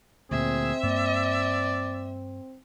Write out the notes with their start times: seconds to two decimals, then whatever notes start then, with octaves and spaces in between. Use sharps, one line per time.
0.31 D2 A#2 C4 G#4 E5
0.83 G2 A#3 D5